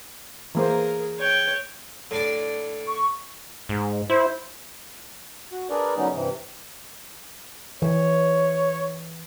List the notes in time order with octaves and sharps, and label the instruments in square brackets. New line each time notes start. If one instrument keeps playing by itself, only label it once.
[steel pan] E3 A#3 C5 [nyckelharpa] G#4 A#4
[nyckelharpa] C#5 G5
[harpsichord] A2 D4 D5
[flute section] C#6
[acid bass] G#2
[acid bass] E4 [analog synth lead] C5
[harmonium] F#4
D4 G#4 A#4 B4 D5
D3 F#3 G3 B3 C#4 D#4
G2 C3 E3
[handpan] E3 [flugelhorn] C#5